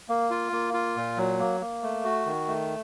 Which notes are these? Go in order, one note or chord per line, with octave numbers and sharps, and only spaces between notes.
A#3
F4
A#3
F4
A#2
F#3
A#3
A#3
A3
F#4
D#3
A3